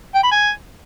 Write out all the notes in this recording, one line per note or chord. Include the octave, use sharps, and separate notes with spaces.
G5
B5
G#5